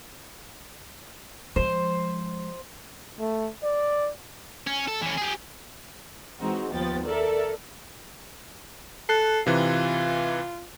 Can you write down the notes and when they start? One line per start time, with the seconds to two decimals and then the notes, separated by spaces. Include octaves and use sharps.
1.56 F3 G#3 C5
3.19 A3
3.63 D5
4.67 C#4
4.88 A4
5.02 E3 C#4
5.18 G4 G#4
6.41 E3 G#3 C4 D#4 F#4
6.74 D#2 F3 B3 G5 A6
7.05 A4 A#4 D5 E5
9.09 A4 F#6 C7
9.46 C3 E3 F4